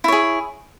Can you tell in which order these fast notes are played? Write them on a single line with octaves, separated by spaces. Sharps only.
E4 C#5 G#4